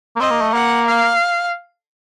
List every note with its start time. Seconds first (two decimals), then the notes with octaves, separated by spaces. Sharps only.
0.16 A#3
0.20 C4 D#5
0.30 A#3
0.41 A3
0.53 A#3 F#5
0.87 F5